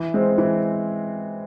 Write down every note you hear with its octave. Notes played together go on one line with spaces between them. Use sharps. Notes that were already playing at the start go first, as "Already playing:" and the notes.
Already playing: E3
G#3 C4
E3